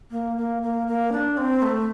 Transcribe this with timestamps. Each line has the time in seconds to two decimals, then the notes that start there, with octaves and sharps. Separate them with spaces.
0.11 A#3
0.37 A#3
0.62 A#3
0.88 A#3
1.12 D4
1.37 C4
1.62 A3